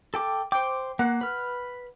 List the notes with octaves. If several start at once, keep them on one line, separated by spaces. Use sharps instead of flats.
A4 G5 D6
C5 G5 D6
A#3 F#5
B4 F6